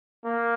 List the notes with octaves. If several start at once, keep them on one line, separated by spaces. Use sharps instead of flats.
A#3